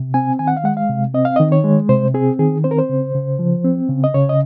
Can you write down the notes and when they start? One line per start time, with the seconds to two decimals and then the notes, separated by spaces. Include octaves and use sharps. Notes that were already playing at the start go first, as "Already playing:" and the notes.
Already playing: C3
0.14 C4 G#5
0.39 D#3 G#5
0.47 F#5
0.57 F5
0.64 G#3 F#5
0.77 F5
0.89 C3
1.14 C4 D#5
1.25 F5
1.36 D#3 D#5
1.52 C#5
1.64 G#3
1.89 C3 C5
2.14 C4 G#4
2.39 D#3 G#4
2.64 C4 C5
2.71 A#4
2.78 C5
2.89 C#3
3.14 C#3
3.39 F3
3.64 C4
3.89 C#3
4.04 D#5
4.14 C#3 C#5
4.29 D#5